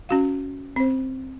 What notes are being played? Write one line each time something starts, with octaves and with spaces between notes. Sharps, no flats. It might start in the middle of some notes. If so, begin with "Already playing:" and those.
C#4 F#4 F5
C4 C5